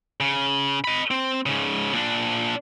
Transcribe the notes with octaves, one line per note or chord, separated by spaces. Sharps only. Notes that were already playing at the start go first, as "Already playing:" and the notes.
C#3
D#5 B5
C4
G#2 C#3
A#2 D4